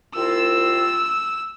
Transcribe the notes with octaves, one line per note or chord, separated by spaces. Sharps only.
C2 C4 F4 E6